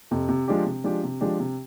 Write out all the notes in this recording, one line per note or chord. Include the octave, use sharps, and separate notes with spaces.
F2 C3
C3
F3 G#3 D4 G4
C3
F3 G#3 D4 G4
C3
F3 G#3 D4 G4
C3